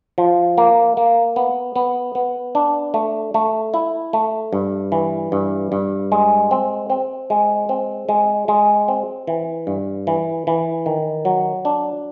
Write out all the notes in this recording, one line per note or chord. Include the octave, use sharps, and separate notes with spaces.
F3
A#3
A#3
B3
B3
B3
D4
A3
A3
E4
A3
G2
E3
G2
G2
G#3
C4
C4
G#3
C4
G#3
G#3
C4
E3
G2
E3
E3
D#3
F#3
D4